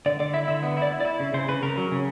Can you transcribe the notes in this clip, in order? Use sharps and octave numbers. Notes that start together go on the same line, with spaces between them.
D3 D5
D3 D5
E4 E5
D3 E5
B3
E4 D5
E4
D5
E4
C#3
C#3 C5
C#3 B4
C#3 A#4
F#3
C#3